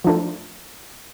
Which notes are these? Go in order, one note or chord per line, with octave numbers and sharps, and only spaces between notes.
F3 A3 D4 F4 A4